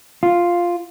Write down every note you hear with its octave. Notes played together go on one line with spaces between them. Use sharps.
F4